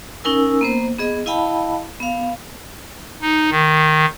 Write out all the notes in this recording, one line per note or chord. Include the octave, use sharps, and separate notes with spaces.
C#4 D#4 A#4 G#5 E6
A#3 B3 C5
B3 G#4 D#5
E4 D#5 F5 G5 A5 B5
B3 F5
D#4
D#3